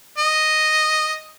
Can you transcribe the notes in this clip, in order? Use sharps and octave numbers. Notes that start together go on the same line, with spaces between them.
D#5